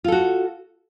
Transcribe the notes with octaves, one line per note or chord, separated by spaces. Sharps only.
F4 F#4 A4